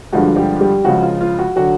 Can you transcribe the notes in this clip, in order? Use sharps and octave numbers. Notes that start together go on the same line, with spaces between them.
G2 D3 F3 G#3 F#4
G3 G4
G3 G4
C#2 C#3 F3 F#4
F4
F4
F#4
D3 F#3 F#4